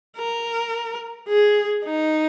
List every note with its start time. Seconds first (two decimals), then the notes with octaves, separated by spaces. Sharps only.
0.18 A#4
1.28 G#4
1.85 D#4